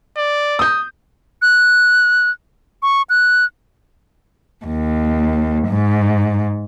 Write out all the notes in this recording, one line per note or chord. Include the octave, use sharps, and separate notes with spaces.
D5
D#6 G6
F#6
C#6
F#6
D#2
G#2